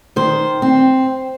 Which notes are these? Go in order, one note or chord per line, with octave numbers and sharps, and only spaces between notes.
D#3 C5
C4